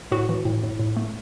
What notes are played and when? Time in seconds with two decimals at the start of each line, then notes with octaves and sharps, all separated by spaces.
0.11 A2 F#4
0.29 E3
0.45 A2
0.63 A2
0.79 A2
0.97 A3